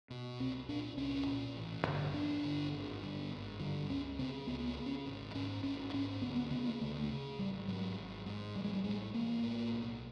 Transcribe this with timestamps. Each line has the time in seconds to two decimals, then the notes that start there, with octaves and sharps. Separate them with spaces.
0.10 B2
0.40 C2 C4
0.69 A#2 D4
0.97 C2 C#4
1.27 A#2
1.56 A1
1.85 G2 D3
2.14 A1 D4
2.43 G2 D3
2.73 G#1
3.02 G2 D3
3.31 G#1
3.60 G2 D3
3.89 C#2 C#4
4.19 C#3 C4
4.47 C#2 B3
4.67 B3
4.76 C#3
4.86 C#4
5.06 G#1
5.34 G#2 C#4
5.63 G#1 C#4
5.93 G#2 C#4
6.22 D2 B3
6.36 B3
6.51 C#3 B3
6.65 A#3
6.81 D2 A3
7.10 C#3
7.39 G#1 G3
7.68 G#2 F#3
7.97 G#1
8.26 G#2
8.55 A1 G3
8.64 G#3
8.74 G3
8.84 A2 G#3
9.14 A1 A#3
9.43 A2
9.72 B1